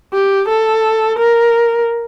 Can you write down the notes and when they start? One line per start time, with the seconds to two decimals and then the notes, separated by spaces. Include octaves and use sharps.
0.13 G4
0.48 A4
1.19 A#4